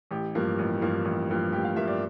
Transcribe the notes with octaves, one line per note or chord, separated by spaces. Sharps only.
A1 G4
G2 F3 A#3
A1
G2 F3 A#3
A1
G2 F3 A#3
A1 G4
F5
G2 F3 A#3 E5
D5